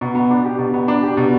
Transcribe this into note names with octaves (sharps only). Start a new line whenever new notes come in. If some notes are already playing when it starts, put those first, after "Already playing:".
B2
B3
D4
G4
B2
B3
D4
G4
B2